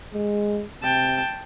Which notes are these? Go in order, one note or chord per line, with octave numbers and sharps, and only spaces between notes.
G#3
C3 G5 A5